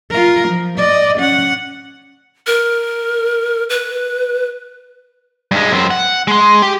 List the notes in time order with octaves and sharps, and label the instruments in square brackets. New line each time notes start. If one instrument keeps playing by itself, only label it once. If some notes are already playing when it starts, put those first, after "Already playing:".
[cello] F4 A#4
F3
D5 D#5
C#4 F#5
[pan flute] A#4
B4
[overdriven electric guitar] G2 G#3
F#2 C4
F#5
G#3 C6
G4 G5